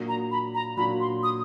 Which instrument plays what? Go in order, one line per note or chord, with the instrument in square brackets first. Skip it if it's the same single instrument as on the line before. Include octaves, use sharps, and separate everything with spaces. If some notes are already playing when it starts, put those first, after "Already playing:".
Already playing: [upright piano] A#2 F#3 A#3 D4 F#4
[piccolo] A#5
B5
A#5
[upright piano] A#2 F#3 A#3 D4 F#4 [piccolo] B5
[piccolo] C6
D#6